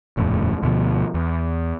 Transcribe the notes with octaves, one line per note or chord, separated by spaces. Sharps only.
D#1 F2 A2 C#3
D2 B2 F3
E2